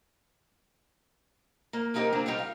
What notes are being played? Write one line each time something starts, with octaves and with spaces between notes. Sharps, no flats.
A#3
F3 A#3 D#4 G4 A#4
C#3 G3 A#3 C4 D4 A#4
G3 D#4 F4 G4
F5